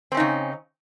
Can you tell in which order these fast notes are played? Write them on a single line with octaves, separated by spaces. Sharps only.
C4 C#4 D#4 C#3